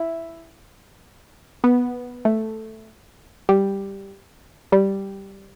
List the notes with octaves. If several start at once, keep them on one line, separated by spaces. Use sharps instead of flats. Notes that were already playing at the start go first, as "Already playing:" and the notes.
Already playing: E4
B3
A3
G3
G3